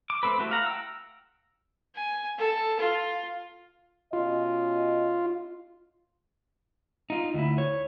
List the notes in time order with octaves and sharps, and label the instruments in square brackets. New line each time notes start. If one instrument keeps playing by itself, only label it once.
[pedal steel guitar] D6
A3 C4 A4 B4
A3 E4 F#4 G4
F5 F#5 A#5
G5 E6
[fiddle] G#5
A4
F4
[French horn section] B2 C#4 D#5 [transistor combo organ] F4
[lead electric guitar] D#4 F4
D2 E4
C#5